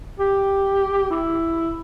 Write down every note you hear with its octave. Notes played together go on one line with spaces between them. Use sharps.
G4
E4